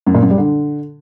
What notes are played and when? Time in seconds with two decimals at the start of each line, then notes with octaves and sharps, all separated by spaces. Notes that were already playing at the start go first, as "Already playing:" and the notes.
0.07 F#2
0.14 A#2
0.22 F#2
0.30 G3
0.38 D3